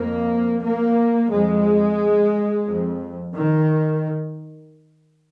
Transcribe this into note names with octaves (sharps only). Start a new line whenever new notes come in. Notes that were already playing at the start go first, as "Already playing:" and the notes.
Already playing: F2 A#3
A#3
F2 G#3
F2
D#3